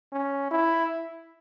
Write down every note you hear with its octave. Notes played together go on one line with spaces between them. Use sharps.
C#4
E4